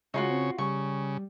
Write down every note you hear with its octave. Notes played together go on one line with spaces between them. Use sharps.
C#3 G#3 D#4 F4 F#4 C#5
C4
C#3 G3 C#6